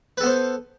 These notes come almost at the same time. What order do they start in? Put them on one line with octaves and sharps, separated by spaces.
B4 A4 B3 C5